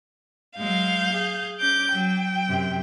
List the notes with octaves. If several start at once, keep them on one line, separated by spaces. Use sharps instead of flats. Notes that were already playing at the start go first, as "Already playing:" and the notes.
F#3 G#3 F5 G6
G#4
C#4 D6 G6
F#3 G5
F#2 C3